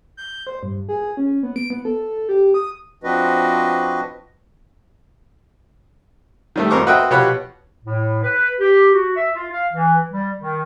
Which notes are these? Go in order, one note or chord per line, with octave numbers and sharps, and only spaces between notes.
G6
C5
G2
G#4
C#4
B3
D7
B3
A4
G4
D#6
F3 C4 D4 F#4 B4 D#5
D#3 G3 A3
G#1 F2 A#4 C5 C#6 D6
F#4 B4 C5 D#5 E5 G5
B2 F3 G4 C#5 F#5 B5
A2
B4
G4
F#4
E5
F4
F5
E3
G3
D#3